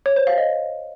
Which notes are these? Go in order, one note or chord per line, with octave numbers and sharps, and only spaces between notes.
C#5
C5
F5
D#5